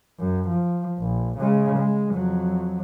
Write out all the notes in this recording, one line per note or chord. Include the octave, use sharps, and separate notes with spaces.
F#2
F3
A#1
C#3 G#3
G#3
F2 F#3